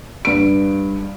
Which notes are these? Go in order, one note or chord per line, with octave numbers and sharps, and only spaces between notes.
G2 D7